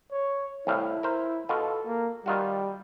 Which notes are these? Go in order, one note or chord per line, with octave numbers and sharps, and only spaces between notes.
C#5
C2 A2 E4 F5
A#4 C5
B2 F4 A4
A#3
D#3 G3 F4 F#4